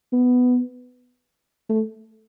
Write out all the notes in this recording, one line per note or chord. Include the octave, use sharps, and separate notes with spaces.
B3
A3